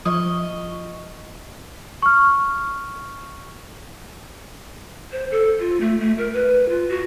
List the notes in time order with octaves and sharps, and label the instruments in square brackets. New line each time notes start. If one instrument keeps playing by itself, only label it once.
[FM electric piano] F3 C#6 [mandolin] D#5
[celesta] C#6 F6
[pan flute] C5
A4
F4
A3
A3
A#4
B4
F4
F#4